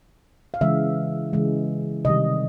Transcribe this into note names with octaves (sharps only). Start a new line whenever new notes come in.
F5
C#3 E3 G#3 E5
C#3 E3 G#3
C3 D#3 G3 D#5